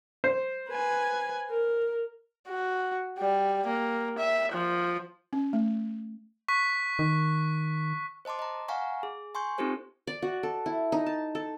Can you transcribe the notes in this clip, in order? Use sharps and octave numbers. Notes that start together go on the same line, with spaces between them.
C5
B4 G#5
A#4
F#4
G3
A#3
E5
F3
C#4
A3
C#6 F#6 B6
D#3
C5 D#5 A5 C6 D6
D#5 A#5
F5 F#5 G#5 A#5 C#6
G#4
G#5 C6 C#6 G6
C4 D#4 F4 G4 A4 C5
D5
F#4
A4
E4
D#4
A5
A4